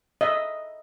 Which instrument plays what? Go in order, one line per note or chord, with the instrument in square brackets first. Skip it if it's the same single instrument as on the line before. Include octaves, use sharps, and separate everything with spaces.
[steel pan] D#5 E5